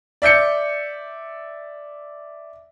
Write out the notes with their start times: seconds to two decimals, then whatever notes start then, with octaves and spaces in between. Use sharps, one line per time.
0.22 D5 E5 G6 C#7